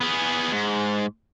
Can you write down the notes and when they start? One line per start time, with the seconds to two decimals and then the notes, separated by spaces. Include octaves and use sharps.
0.01 B3 G#4
0.52 G#2